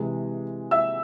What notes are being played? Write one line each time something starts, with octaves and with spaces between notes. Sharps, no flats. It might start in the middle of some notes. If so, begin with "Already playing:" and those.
Already playing: C3 E3 G#3
E5 E6